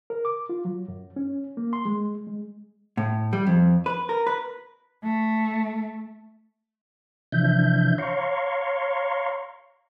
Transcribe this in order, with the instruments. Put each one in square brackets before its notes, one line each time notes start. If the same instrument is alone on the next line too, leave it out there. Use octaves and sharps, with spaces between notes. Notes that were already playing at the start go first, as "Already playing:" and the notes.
[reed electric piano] A#4
D6
F4
F#3
F#2
C#4
A#3
C6
G#3
G#3
[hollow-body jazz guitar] A2
G3
F2
B4
A#4
B4
[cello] A3
[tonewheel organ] C3 E3 F3 D4 E5 G6
C#5 F5 A#5 C6 C#6